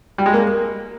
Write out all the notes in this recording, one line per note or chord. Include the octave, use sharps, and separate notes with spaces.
G3
G#3
A#3